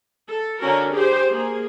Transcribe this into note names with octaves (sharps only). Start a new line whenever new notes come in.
A4
D3 C#4 F#4 A#4
G4 G#4 C5
A#3 G#4